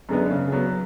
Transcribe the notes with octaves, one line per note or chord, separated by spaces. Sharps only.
F#2 D3 G#3 B3
C#3
F#3 B3